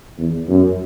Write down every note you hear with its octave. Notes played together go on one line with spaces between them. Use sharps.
E2
F#2